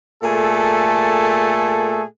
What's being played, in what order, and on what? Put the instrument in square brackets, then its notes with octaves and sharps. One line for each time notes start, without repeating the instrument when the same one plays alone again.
[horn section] A#2 A3 G#4 A4